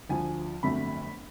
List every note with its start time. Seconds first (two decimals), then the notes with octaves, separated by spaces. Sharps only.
0.09 D2 D3 F3 G#5
0.63 G1 F2 D3 F#3 A3 B5